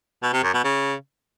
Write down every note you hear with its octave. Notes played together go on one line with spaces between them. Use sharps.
B2
C3
F#2
B2
C#3